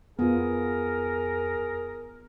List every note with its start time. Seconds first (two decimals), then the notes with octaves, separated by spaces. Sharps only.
0.19 F2 B3 F4 G#4 A#4